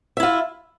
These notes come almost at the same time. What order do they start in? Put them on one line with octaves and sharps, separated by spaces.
E5 E4 F4